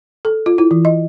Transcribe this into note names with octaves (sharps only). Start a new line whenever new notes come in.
A4
F4
E4
E3
D#5